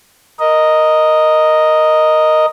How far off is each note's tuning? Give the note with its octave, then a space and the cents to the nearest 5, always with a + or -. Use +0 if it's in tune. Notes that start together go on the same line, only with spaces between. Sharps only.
A#4 +0 D#5 +0